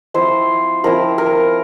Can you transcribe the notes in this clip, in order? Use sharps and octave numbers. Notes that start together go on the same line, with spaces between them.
F3 C4 E4 C5
F3 C4 E4 A#4
A#4